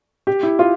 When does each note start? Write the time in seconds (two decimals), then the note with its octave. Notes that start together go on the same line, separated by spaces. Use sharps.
0.27 G4
0.43 E4
0.59 F4